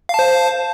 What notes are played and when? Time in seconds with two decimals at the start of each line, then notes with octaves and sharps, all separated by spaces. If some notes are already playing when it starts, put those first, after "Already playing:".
0.09 F5
0.14 A5
0.19 C5